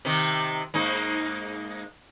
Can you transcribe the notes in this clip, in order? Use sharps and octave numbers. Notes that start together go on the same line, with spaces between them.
C3 D#3
G#2 A#3 D#4